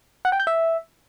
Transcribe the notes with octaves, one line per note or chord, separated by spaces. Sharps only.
F#5
G5
G6
E5